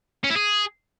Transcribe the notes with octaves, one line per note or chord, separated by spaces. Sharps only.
C#4
E4
G#4